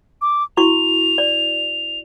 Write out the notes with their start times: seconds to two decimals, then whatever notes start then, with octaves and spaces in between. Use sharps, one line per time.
0.21 D6
0.57 E4 F#4 C#6 F7
1.18 D5